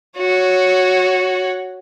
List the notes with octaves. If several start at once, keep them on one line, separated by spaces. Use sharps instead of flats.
F#4 C#5